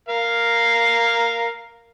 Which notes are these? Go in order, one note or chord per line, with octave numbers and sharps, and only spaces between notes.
A#4 F5